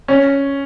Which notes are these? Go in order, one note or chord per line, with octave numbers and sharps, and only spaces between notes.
C#4